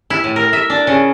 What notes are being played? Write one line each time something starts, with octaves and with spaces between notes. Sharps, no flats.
E4
A2
A#4
E5
D4
C#3